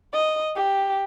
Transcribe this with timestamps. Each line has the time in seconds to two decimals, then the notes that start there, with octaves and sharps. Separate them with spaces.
0.13 D#5
0.56 G4